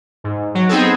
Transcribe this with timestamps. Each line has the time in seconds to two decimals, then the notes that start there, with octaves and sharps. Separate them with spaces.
0.24 G#2
0.55 F#3
0.69 B3 C4 D#4 G#4 A4